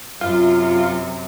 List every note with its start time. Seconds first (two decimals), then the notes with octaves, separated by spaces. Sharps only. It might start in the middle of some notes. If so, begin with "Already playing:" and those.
0.21 F#2 C3 F4